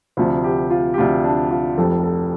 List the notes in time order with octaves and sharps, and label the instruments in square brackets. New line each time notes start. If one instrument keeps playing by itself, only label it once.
[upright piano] D2 C3 F3 C5
G4
F4
G4
D2 C3 F3 F4
D4
F4
F1 F2 F3 A4
A4